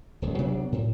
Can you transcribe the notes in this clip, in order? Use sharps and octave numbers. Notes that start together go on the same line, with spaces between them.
D#1 C#2
C3 F#3 B3 D4
A2